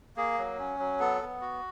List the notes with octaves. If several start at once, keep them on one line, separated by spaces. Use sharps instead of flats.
A#3 G#4
F#3
C#4
F#3
B3 A4
B3
F#4